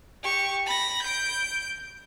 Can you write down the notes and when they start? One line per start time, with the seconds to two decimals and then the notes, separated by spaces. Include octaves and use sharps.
0.23 G4 C#6
0.66 B5 A#6
1.02 G6 D7